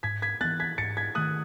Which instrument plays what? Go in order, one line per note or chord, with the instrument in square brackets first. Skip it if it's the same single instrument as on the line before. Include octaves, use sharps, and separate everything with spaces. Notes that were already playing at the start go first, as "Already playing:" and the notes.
[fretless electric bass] G#2 [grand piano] G#6 B6
[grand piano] G#6 B6
[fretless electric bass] E3 B3 [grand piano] F#6 A6
[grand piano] G#6 B6
[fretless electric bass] G#2 [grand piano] A6 C#7
[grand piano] G#6 B6
[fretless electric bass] D#3 A3 [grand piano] D#6 F#6